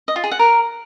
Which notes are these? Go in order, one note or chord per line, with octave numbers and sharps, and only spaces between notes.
D#5
F4
G#4
F#5
A#4